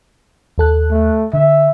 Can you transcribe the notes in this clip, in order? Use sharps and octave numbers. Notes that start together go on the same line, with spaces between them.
D#2 A4 F#6
A3
D3 E5